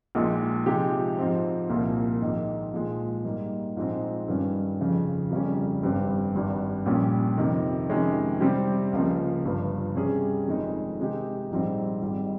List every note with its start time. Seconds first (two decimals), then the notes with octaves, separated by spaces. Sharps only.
0.15 A#1 A#2 G#3 D#4
0.66 C3 F3 G#3 D#4 G4
1.18 G#2 F3 C4
1.69 C2 A#2 F3 A#3
2.22 A#1 G#2 D#3
2.73 A#1 A#2 F3 G#3
3.24 G#2 G3 A#3
3.76 A#1 G#2 F3 G#3 C4
4.28 G2 D#3 G3 C#4
4.80 F1 F2 C#3 F3
5.31 F1 F2 C#3 G3 C#4
5.82 G#1 G2 G3 C4 G4
6.35 G#1 G2 G3
6.86 A#1 A#2 G3 C#4
7.38 F2 C3 D#3
7.89 F2 C3 D#3 G#3 C#4
8.40 C3 G3 C4 G4
8.93 C#2 C#3 F3 A#3
9.45 G1 G2 F3
9.95 C3 G3 C#4 G#4
10.48 F1 F2 D#3 G#3 D#4
11.00 C3 D#3 G#3 D#4 G4
11.51 A#1 G#2 G3 C4
12.02 G#1 G#2 G3